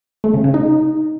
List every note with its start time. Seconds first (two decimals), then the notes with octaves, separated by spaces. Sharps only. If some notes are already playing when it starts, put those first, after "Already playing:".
0.24 A3
0.34 C#3
0.44 C#3
0.54 D#4